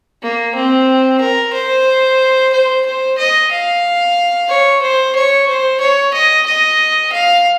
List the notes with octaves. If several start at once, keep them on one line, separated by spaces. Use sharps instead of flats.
A#3
C4
A#4
C5
C5
C5
D#5
F5
C#5
C5
C#5
C5
C#5
D#5
D#5
F5